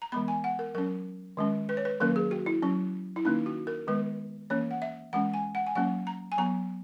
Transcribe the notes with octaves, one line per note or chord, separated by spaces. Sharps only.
A#5
E3 G#3 B3 B5
G#5
F#5
A#4
F#3 C#4 A#4
D#3 G#3 C#4
B4
C#5
B4
D#3 F#3 A#3 C#4 A#4
G#4
F#4
E4
F#3 C#4
E4
D#3 A#3 C#4 D#4
F#4
A#4
D#3 G#3 B3 B4
E3 A#3 C#4 C#5
F#5
E5
E3 G#3 C#4 F#5
G#5
F#5
G#5
F#3 A#3 C#4 F#5
A#5
G#5
F#3 B3 A#5